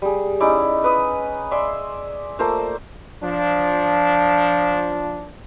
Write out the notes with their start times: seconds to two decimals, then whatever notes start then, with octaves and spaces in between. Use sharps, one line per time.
0.02 G3 G#4
0.40 C#4 D#4 E4 D5
0.84 B4 D#6
1.51 D5 E5 G#5 C6
2.39 A3 A#3 F4 C5
3.22 F3 D4